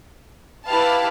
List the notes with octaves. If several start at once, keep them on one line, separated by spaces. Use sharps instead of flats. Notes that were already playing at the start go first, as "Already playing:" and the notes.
E4 G4 B4 F5 A5